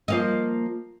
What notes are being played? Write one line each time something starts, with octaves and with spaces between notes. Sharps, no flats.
F3 A#3 D#5